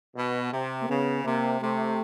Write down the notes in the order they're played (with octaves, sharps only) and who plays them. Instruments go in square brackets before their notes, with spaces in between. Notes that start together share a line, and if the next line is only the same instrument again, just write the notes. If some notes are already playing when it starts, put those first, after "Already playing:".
[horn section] B2
C3
[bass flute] A#3
[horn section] C#3 [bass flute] B3
[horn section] C3 [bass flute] A#3
[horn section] C3 [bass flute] A3